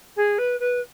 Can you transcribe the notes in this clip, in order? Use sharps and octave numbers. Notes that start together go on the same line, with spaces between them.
G#4
B4
B4